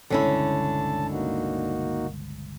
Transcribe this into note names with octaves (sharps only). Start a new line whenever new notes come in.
G1 C#2 B2 D3 C#4 E4 A5
A#3 D#4 F#4